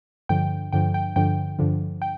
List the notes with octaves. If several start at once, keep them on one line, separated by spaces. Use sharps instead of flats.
G2 D3 F3 G5
G2 D3 F3 G5
G5
G2 D3 F3 G5
G2 D3 F3
G5